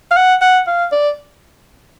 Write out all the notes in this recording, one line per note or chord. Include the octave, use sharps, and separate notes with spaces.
F5
F#5
F#5
F5
D5